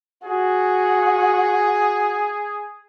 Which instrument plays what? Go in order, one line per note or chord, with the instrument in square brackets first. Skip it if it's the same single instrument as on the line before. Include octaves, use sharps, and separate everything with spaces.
[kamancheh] F#4 [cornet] G#4